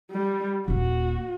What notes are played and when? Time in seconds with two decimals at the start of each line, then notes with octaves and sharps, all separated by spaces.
0.11 G3
0.68 D#1 A#3 F#4